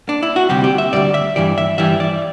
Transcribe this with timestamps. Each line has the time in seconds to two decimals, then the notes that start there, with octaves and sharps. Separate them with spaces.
0.09 D4
0.23 E4
0.36 F#4
0.49 D2 C3 G3 G4
0.64 G4
0.78 E5
0.93 D2 C3 G3 D5
1.14 E5
1.36 G2 E3 G3 D5
1.58 E5
1.78 G2 E3 G3 E5
2.00 D5